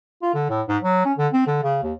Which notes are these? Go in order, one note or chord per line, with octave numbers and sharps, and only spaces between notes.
F4
D3
A2
G#2
F#3
C#4
D3
C4
D3
C#3
D#2